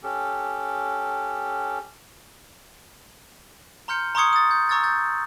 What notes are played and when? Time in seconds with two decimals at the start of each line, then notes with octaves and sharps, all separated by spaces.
0.03 C#4 G4 A4
3.88 A#5 C6 F6 G6 C#7
4.15 A#5 C6 C#6 D#6 G#6 C#7
4.33 D#6 A6
4.51 G6
4.69 A#5 C#6 E6 G#6 A6
4.83 E6 G6 A6